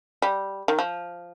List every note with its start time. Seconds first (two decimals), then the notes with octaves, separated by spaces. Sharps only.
0.22 G3
0.68 D#3
0.79 F3